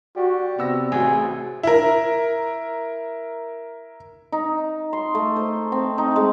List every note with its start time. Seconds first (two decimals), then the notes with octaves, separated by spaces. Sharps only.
0.16 G3 F#4
0.59 C3 B3 E6 A#6
0.92 A1 F#4 G#4
1.63 E4 A#4
4.32 D#4
4.93 C6
5.15 A3
5.36 C5
5.72 C4
5.98 D#4
6.16 G#3